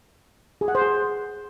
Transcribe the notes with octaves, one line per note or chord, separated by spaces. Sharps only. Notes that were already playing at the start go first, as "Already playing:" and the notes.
G#4
F#5
C5
G#4